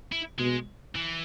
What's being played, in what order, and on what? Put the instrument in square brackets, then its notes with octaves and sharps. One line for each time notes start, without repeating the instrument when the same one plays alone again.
[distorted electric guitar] E4
[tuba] B2 [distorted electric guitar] G#3
[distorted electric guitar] E3